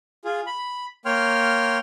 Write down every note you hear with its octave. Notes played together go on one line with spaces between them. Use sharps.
F4 G#4
B5
A#3 C#5 G5 C6 F6